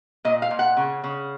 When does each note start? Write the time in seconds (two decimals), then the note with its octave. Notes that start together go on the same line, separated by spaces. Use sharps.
0.25 A#2 D#5
0.42 F5
0.51 A#2
0.59 F#5
0.77 C#3
1.04 C#3